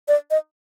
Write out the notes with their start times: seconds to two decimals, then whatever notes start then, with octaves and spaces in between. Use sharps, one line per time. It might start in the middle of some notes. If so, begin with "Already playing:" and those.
0.08 D5
0.31 D#5